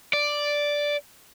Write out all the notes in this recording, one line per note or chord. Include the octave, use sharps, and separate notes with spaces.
D5